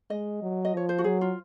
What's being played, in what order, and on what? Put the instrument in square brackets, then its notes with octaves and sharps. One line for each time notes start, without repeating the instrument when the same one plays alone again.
[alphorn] G#3 [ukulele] D#5
[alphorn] F#3
[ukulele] D#5
[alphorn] F3 [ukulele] C#5
[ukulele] C5
F#4
[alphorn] F#3 [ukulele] G#4
[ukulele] F4